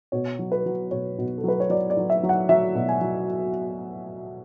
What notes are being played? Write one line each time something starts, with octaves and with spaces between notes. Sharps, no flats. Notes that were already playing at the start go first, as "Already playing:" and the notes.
B2 C#5
F#3
B4
F#3
B2 C#5
B2
A4
F#3 B4
C#5
F#3 D5
D5
F#3
E5
F#3
F#5
F#3 E5
B2
G#5
F#3